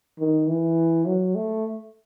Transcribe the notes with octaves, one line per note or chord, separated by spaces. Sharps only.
D#3
E3
F#3
A3